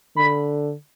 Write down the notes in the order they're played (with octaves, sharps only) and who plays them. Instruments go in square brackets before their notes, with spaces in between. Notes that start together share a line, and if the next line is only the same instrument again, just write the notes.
[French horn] D3 [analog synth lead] B5